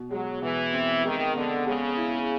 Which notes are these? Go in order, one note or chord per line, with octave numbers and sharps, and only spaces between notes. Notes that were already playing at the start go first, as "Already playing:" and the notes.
Already playing: B2
F#3 G#3
B2 E3
C4
D#3 G#3
D3 B3
C#3 G#3
E4